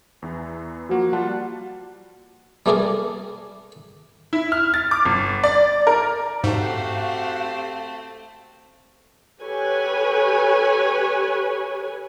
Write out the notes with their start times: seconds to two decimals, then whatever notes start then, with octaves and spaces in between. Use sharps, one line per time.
0.22 E2 E3
0.89 F3 A#3 F#4
1.13 G3 F4 F#5 A5
2.66 G3 A3 A#3 G#4 A#4 D5
4.33 E4
4.52 F6
4.74 A6
4.91 D6
5.05 G1
5.44 D5
5.87 A#4
6.44 G#2 A3 C4 F#4 G4 F5 F#5
9.40 G4 A4 B4 C#5 G#5